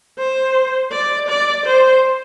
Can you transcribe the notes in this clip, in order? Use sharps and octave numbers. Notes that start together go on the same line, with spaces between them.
C5
D5
D5
C5